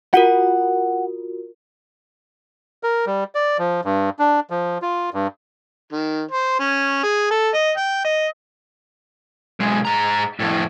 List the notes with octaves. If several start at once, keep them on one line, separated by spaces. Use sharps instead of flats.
F4 F#4 A#4 F#5
A#4
G3
D5
F3
G2
D4
F3
F4
G2
D#3
C5
C#4
G#4
A4
D#5
G5
D#5
B1 G#3
G#2 A#5
F2 A2